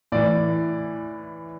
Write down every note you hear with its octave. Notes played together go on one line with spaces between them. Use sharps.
A2 E3 D5